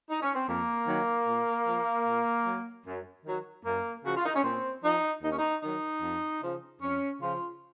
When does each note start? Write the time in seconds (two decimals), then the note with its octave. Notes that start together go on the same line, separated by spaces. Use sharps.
0.10 D#4
0.22 C#4
0.35 C4
0.48 F2 A#3
0.87 D#3 F#3
1.27 A#2
1.67 F3
2.07 A#2
2.46 F#3
2.86 F#2
3.25 D#3 F#3
3.65 F#2 A#3
4.04 C#3 F3 F#4
4.17 F4
4.26 D#4
4.35 C#4
4.44 A#2 C4
4.83 F3 D#4
5.23 D#2 D#4
5.31 C#4
5.39 D#4
5.63 D#3 F#3 D#4
6.02 F2
6.42 C#3 F3
6.82 F2 C#4
7.21 C#3 F3 F4